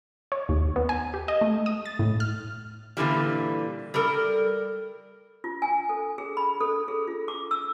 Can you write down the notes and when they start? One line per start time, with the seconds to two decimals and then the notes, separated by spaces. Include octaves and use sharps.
0.32 C#5
0.49 D#2
0.76 B3
0.89 G#5
1.14 G4
1.28 D#5
1.41 A3
1.66 D#6
1.86 A6
1.99 A2
2.20 F6
2.97 A#2 D3 E3 G3
3.94 G3 A4 A#4
5.44 F4
5.62 G#5
5.89 A4
6.18 G#4
6.37 B5
6.61 A4
6.88 G#4
7.07 F4
7.28 D6
7.51 E6